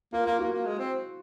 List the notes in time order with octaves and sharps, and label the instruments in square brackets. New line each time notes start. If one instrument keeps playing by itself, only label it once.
[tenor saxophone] A#3 [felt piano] F4
[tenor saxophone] A#3 [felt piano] F4
[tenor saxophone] A#3 [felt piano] F#4
[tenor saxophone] A#3
G#3
C4